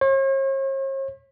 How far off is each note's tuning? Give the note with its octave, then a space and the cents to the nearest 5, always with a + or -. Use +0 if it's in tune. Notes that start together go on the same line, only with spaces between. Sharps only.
C#5 -45